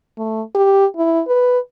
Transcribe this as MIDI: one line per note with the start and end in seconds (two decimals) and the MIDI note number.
0.18 0.42 57
0.55 0.86 67
0.96 1.21 64
1.28 1.59 71